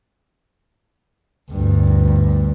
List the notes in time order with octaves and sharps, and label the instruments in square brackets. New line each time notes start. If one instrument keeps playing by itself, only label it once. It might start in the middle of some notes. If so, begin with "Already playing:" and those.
[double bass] D2 G2